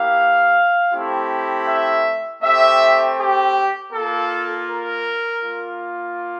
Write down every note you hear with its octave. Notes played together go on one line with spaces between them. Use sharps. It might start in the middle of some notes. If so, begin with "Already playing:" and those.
Already playing: A#3 E4 G4 F5
A3 C4 E4 G4
E5
A3 C4 G4 E5
G4
A#3 F4 A4
A#4
A#3 F4